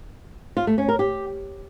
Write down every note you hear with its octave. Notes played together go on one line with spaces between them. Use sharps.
F4
A3
C#4
A#4
G4